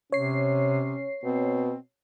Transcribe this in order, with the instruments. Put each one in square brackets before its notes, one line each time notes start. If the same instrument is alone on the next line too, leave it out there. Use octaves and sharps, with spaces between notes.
[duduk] C3 [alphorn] C#4 [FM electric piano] C#5 C7
[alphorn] B2 [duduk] C4